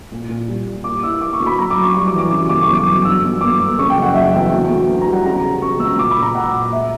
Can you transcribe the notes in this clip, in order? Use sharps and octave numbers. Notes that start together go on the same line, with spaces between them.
A#2
A#2
G3
A#2
A#3 D6
E4 E6
E4 D6
C#6
D2
B5
F#2 A#5
D6
F#2
C#6
G3 C#6
D6
E3
D6
C#3
G1 D6
C#6
F#3
D6
F#2
D3 E6
G1
A#3 D6
G1
C#3 C#6
G5
F#1
F#5
F#3 E5
E2 G5
D2
D2
D2
A#5
G3
F#5
C#3 A#5
C#3
C#3 C#6
C#2 E6
A#2 D6
B5
A#2
A#5
A#2 F#5
A#2
E5